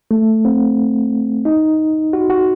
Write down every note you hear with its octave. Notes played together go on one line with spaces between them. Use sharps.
A3
C4
D#4
F#4
F#4